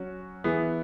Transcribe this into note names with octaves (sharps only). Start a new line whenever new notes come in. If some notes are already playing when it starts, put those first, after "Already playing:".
Already playing: F#3 C#4 F#4
E3 B3 G#4